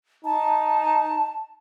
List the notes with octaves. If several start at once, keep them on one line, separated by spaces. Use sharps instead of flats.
D#4 A5